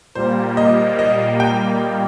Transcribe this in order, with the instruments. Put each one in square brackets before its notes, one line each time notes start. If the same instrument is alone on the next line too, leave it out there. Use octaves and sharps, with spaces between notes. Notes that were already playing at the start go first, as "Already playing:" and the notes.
[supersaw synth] A#2 G3 A#3 [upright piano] C5
[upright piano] D#5
D#5
G5